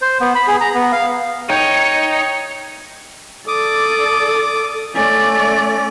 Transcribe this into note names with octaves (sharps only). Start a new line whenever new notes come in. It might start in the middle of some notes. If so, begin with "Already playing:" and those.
C5
B3
B5
G#4
A#5
B3
F5
D#4 C#5 G5
A4 D5 D6 D#6
A3 C#4 D5